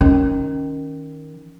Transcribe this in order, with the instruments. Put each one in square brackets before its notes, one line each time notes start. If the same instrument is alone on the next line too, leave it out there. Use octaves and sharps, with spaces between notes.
[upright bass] D#3 [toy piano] C#4